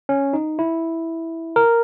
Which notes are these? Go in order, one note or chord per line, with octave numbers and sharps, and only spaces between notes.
C#4
D#4
E4
A#4